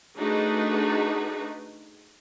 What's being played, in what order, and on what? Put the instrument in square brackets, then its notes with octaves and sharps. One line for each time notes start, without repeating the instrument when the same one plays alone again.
[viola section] A3 D4 D#4 F#4 G#4 B4